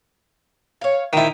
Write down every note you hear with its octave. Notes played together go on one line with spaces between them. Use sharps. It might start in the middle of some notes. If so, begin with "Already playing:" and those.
C#5 F5
A#2 D#3 F3 E4 G5